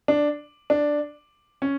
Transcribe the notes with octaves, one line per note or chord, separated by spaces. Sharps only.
D4
D4
C#4